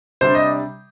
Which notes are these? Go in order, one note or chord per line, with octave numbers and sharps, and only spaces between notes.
C3 G3 D4 C5
D#5